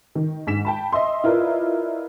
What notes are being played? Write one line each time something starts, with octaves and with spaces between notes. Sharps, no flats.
D#3
G#2 B6 E7
G5 A5 B5
D#5 E5 C6
E4 F4 A#4 B4 D5 D#5